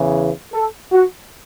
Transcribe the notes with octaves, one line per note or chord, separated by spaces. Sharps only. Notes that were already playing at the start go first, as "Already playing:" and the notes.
Already playing: E2 C#3 E3
A4
F#4